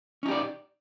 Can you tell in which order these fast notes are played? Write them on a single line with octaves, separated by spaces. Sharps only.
C#4 D#4 G4 D5